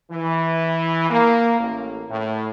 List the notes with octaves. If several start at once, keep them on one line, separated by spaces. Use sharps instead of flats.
E3
A#3
A1
A2